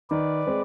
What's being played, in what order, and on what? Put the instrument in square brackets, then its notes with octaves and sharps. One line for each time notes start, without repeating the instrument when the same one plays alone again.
[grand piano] D#3 [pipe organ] B4 D5
[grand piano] G#3 C4